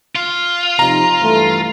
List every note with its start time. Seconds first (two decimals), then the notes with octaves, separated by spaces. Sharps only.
0.15 F4
0.79 C3 F3 D#4 A#5
1.22 G2 E3 A3